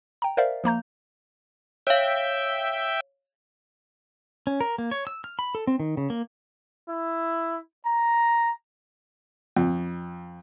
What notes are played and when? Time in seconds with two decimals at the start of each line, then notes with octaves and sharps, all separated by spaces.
0.22 G5 A#5
0.37 A#4 C5 D5 E5 F5
0.64 F3 A#3 A#5 G6
1.87 C#5 E5 F5 G5
4.47 C#4
4.61 A#4
4.78 A#3
4.91 C#5
5.07 E6
5.24 F6
5.39 B5
5.55 A4
5.67 C4
5.80 D#3
5.97 C#3
6.10 A#3
6.89 E4
7.86 A#5
9.57 F2